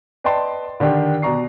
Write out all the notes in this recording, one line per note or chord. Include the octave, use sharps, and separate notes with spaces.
B4 D5 D#5 G5 A5 C6
D3 D#3 D4 G4
B2 D5 A#5 C#6 C7